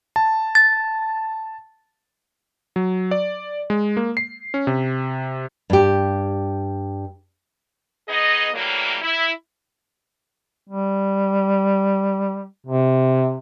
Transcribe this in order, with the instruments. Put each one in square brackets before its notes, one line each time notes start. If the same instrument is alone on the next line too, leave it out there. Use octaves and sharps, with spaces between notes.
[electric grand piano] A5
[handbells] A6
[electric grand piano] F#3
D5
G#3
A#3
C7
C#4
C3
[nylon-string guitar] G2 G4
[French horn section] B3 D#4 G#4 D#5
A2 E3 F#3 G3 A#3
E4
[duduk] G3
C3